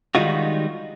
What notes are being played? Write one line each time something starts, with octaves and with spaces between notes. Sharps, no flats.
D#3 G3 G#3 D#4 F4 F#4